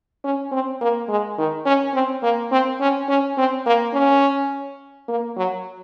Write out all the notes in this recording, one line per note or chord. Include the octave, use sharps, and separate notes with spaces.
C#4
C4
A#3
G#3
D#3
C#4
C4
A#3
C4
C#4
C#4
C4
A#3
C#4
A#3
F#3